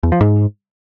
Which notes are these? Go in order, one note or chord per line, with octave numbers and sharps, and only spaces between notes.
E2
F3
G#2